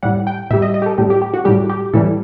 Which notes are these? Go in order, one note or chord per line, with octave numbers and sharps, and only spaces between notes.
A2 G3 F#5
G5
A2 G3 E5
D#5
D#5
G4
A4
A2 G3 G4
G4
G4
F#4
A2 G3 G4
G4
A2 E3 G3 A4